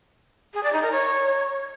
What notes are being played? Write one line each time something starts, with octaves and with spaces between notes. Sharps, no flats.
G#4
D5
D#4
A#4
C#5